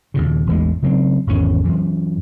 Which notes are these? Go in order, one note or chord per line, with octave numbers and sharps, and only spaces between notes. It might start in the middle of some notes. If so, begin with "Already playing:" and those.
D#2 A#2 C#3
A1 E2 A2 G#3
C#3 F#3 C4
G#1 E2 B2 C#4
F#2 E3